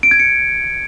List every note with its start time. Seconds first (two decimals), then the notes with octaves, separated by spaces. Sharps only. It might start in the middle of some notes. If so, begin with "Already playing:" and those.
0.03 D7
0.11 G#6
0.19 C#7